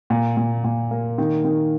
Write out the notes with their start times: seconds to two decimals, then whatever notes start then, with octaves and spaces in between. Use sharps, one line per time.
0.10 A#2
0.37 A#2
0.64 A#2
0.91 A#3
1.18 D#3
1.45 D#3